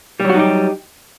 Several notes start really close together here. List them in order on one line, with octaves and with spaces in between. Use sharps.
G3 F#3 F#4 D#4 G4